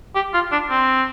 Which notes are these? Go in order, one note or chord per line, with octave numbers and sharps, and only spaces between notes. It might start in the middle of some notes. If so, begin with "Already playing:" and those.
G4
F4
D4
C4